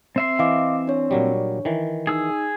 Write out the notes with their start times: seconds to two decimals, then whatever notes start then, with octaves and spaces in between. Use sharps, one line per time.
0.16 C4 E5 C6
0.39 E3 D#5 F5 D6
0.87 D4 C#5
1.11 A#2 F#3 G3
1.65 D#3 E3
2.07 D#4 G#4 E6